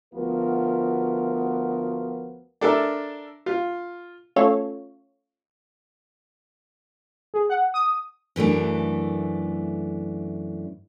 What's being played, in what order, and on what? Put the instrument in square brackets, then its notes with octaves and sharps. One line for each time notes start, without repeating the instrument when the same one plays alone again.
[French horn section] D2 F3 B3 F4 F#4 A#4
[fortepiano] D4 A4 A#4 E5
F4
[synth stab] A3 C#4 F4 A4 C#5
G#4
F#5
D#6
[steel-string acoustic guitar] F#2 E3 A3 D4